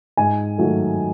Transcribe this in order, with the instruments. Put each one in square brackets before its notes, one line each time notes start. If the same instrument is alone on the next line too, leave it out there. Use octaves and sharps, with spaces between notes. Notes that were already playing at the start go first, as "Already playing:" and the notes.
[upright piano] G#2 G#5
D#3 F#3 A3